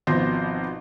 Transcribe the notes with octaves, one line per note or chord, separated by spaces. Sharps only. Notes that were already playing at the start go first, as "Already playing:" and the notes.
G#1 B2 F3 C4 C5 A#6